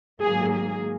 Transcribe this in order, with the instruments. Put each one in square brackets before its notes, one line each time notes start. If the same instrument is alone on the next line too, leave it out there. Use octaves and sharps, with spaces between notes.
[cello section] G#2 D#3 F#3 A#3 G#4
G#4